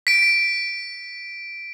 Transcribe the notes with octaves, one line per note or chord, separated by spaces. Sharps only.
B6 D7